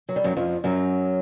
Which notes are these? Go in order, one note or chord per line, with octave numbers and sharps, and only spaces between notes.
F#3
G3
F#2 F#3
F2 F3
F#2 F#3